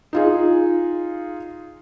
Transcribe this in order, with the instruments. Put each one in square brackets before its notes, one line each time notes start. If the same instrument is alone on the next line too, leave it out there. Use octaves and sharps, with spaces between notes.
[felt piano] D#4 F4 G#4